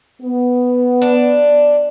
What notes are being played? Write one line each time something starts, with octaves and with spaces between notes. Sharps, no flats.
B3
D4